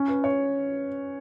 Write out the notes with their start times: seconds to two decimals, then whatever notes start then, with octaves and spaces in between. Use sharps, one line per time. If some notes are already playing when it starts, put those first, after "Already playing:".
Already playing: C#4
0.08 B4
0.24 C#5